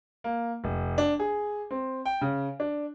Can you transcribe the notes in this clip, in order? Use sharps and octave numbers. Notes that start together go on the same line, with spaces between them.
A#3
F1
D4
G#4
C4
G5
C#3
D4